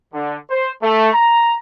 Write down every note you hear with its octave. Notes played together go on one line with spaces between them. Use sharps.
D3
C5
A3
A#5